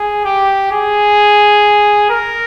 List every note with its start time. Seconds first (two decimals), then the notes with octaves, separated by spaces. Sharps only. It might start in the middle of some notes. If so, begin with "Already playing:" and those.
Already playing: G#4
0.25 G4
0.71 G#4
2.09 A#4